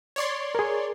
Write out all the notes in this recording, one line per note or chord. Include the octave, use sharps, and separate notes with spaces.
C#5 D5 C6
G#4 A#4